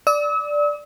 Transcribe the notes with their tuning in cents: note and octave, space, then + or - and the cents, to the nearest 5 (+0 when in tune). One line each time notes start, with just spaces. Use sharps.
D5 +0 E6 -45